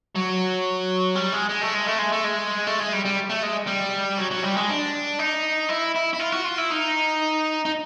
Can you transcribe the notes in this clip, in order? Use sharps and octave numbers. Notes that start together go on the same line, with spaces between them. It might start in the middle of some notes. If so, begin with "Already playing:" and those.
F#3
G3
G#3
G#3
A3
G#3
A3
G#3
A3
G#3
A3
G#3
G3
G3
A3
G#3
G3
F#3
F#3
G3
G#3
D4
D#4
E4
E4
E4
F4
F#4
F4
E4
D#4
D#4